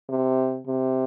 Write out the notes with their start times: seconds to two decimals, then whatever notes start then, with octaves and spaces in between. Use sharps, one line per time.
0.09 C3
0.67 C3